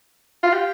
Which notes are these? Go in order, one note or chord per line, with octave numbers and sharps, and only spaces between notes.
F4
G4